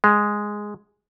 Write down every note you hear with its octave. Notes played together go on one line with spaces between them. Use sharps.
G#3